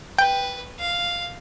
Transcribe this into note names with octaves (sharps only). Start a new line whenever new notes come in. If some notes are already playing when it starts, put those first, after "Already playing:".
B4 G5
F5